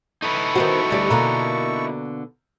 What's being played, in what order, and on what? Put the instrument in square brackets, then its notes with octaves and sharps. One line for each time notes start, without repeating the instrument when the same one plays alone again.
[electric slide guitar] D#4 E4 B4 [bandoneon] A4 C#6
[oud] D#3 B3 C5 [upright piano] F#4
[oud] D2 G3 D5
[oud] B2 D3 A#3 [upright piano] A#5